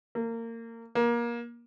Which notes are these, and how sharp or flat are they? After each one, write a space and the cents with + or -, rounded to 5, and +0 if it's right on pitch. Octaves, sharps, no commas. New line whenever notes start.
A#3 -25
A#3 +25